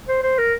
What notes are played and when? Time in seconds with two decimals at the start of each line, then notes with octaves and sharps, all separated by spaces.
0.09 C5
0.23 C5
0.38 A#4